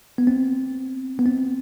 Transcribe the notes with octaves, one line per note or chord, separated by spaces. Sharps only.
B3
C4
B3
C4